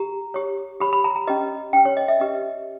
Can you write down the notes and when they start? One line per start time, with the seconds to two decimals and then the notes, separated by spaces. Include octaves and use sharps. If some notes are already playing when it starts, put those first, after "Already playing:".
Already playing: G4 A#5
0.34 G4 C#5
0.80 G4 C#5 B5
0.93 B5
1.04 A#5
1.16 A#5
1.27 C#4 G4 B4 D#5
1.73 C#4 G4 B4 G5
1.85 C#5
1.97 D#5
2.08 E5
2.20 C#4 G4 B4 D#5